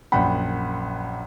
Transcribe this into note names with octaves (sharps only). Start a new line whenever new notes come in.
A#1 F#2 F#5 G5 B5